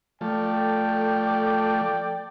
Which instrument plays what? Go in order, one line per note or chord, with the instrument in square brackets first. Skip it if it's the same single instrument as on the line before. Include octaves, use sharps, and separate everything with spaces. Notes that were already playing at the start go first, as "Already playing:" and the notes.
[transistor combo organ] F3 A3 [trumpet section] A4 D5 G5